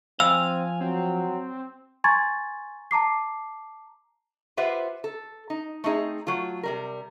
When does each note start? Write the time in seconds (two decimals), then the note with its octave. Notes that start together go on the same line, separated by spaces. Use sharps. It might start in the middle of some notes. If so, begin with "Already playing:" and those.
0.20 F3 C4 F5 G#5 E6
0.81 F#3 C4
2.04 G#5 A#5 C6 C#6 G#6 A6
2.91 A5 A#5 D6 C7
4.57 F4 G4 B4 C5 E5 F#5
5.04 A4
5.50 D#4
5.84 A3 C4 D#4 G#4
6.27 F#3 A3 F4
6.63 C3 G3 A#4